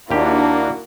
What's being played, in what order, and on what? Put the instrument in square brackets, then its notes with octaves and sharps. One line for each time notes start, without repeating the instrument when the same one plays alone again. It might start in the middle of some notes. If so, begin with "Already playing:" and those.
[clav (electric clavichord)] D#2 G4 [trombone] A#3 [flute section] D4 [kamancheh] E4 F#4